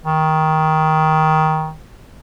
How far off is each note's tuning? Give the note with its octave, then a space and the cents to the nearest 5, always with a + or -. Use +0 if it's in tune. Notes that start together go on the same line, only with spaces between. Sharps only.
D#3 +15